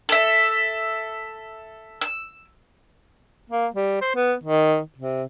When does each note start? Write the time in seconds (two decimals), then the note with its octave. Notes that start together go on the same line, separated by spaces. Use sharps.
0.09 A4 E5
2.01 E6
3.50 A#3
3.74 G3
4.01 C5
4.16 B3
4.43 D#3
4.98 C3